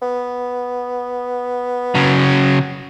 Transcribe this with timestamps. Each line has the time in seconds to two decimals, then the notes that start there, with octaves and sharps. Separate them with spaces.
0.02 B3
1.95 C#3 F#3